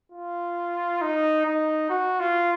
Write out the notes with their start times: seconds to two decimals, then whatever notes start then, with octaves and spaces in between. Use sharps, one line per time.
0.12 F4
1.02 D#4
1.46 D#4
1.90 F#4
2.20 F4